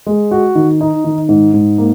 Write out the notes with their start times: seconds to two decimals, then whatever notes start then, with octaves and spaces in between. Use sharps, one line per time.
0.06 G#3
0.31 F#4
0.55 D#3
0.81 D#4
1.04 D#3
1.29 G#2
1.54 G#2
1.78 A#3